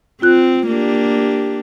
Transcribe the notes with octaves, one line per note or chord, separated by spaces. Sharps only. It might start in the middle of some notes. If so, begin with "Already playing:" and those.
C4 F4 F#6
A#3 D4 G4